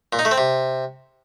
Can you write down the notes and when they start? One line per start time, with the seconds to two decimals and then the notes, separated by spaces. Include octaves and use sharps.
0.13 A#2
0.19 D#4
0.25 A3
0.31 C4
0.38 C3